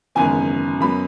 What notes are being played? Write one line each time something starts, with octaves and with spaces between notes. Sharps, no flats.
G#1 F#2 C#3 E3 B3 G#5
F#2 F#3 B3 B5